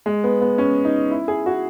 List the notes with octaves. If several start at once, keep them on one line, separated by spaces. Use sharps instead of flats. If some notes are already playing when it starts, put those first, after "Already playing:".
G#3
B3
B3
C#4
D#4
E4
G#4
F#4